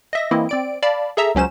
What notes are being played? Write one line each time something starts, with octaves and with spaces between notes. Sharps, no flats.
D#5 E5 A#6
E3 A#3 C4 E4 D#5
C4 D5 D7
D5 F5 A5 B5
G#4 A4 E5 A#5 E6
C#2 F#3 C#4 C5 E7